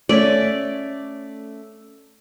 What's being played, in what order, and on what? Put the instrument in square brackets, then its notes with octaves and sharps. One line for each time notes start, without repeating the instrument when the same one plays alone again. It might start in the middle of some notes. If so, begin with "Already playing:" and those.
[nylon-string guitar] A3 C#4 C#5 [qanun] D5